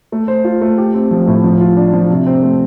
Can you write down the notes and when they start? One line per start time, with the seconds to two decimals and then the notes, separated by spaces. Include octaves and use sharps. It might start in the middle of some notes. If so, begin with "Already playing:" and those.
0.12 A3
0.28 C5
0.45 F4
0.61 A3
0.78 G4
0.94 C4
1.11 F3
1.27 A2
1.44 F3
1.61 F4
1.77 D4
1.94 F3
2.10 C3
2.26 C4
2.43 A3